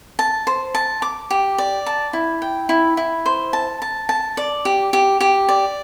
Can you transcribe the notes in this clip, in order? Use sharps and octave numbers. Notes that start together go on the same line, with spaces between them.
A5
C5
A5
D6
G4
D5
A5
E4
G5
E4
E4
C5
A5
A5
A5
D5
G4
G4
G4
D5